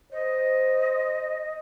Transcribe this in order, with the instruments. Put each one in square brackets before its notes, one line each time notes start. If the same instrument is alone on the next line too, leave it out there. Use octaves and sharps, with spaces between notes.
[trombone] C5 [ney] D#5